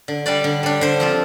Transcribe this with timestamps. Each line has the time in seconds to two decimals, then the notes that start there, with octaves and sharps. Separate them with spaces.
0.08 D3
0.26 G3 D4 D5
0.44 D3
0.63 G3 D4
0.81 D3 C5
1.00 F3 C4 F4